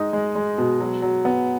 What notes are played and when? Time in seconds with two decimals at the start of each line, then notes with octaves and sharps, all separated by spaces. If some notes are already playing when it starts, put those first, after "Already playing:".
Already playing: G#3 D#4
0.13 G#3
0.35 G#3
0.58 B2
0.80 F#3
1.02 F#3
1.25 B3